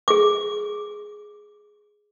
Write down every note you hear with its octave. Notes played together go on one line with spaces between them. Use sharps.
G#4 D6